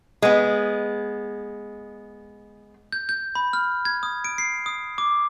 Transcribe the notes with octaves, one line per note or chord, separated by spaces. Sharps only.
G#3 B3
G6
G6
B5
F6
G#6
D#6
D7
C7
D#6
D6